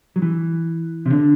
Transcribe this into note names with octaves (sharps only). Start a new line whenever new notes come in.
F#3
E3
C3
D3